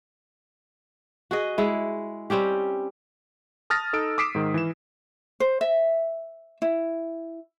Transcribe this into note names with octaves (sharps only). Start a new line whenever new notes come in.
F#4 G#4 D#5
G#3 E4
G3 C4 C#4 G4
A5 D#6 F6 A6 A#6
D#4 A4 E6 D7
D6 D#6 B6 C7 D7 E7
G#2 D#3
E3 E7
C5
E5
E4